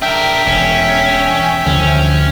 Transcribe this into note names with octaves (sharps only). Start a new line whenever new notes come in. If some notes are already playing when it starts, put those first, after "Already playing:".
D4 A#4 E5 G5
E1 C#4
D2 D3 F3 C#4